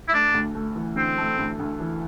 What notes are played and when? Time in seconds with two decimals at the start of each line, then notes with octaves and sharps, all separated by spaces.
0.08 E4
0.13 A3 D4
0.34 D2
0.55 A3
0.76 E3
0.96 D2 C4
1.18 A3
1.39 D2
1.59 D2
1.80 E3